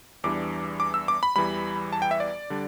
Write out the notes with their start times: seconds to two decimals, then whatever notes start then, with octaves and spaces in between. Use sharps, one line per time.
0.24 E2 E3 G3 D4 D6
0.80 D6
0.94 E6
1.08 D6
1.23 B5
1.36 E2 E3 G3 B5
1.93 A5
2.02 G5
2.11 E5
2.20 D5
2.50 D3 G3 D4